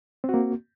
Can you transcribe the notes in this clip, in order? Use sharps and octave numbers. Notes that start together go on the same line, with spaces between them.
A#3 C4 F#4